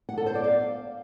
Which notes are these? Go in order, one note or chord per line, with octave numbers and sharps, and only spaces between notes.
F#5
A4
C5
D5
F5